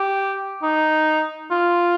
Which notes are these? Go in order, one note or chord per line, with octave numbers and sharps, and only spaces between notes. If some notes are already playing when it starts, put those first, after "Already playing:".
Already playing: G4
D#4
F4